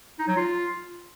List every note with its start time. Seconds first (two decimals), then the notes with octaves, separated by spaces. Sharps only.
0.19 D#4
0.28 F#3
0.36 F4